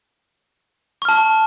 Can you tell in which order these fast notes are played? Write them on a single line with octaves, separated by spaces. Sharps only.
C#6 F6 A5